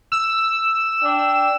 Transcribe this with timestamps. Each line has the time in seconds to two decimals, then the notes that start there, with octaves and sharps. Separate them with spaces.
0.12 E6
1.03 D4 G5